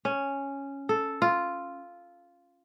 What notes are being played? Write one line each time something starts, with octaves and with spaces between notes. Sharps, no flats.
C#4
A4
F4